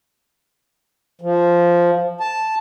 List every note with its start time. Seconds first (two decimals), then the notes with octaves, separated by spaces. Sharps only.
1.21 F3
2.20 A5